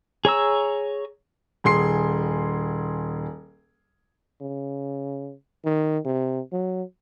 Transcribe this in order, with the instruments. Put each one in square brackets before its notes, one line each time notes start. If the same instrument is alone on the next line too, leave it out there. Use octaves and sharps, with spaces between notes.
[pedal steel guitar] G#4 C#5 A#5 E6
[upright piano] D#1 G#4 C6 C7
[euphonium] C#3
D#3
C3
F#3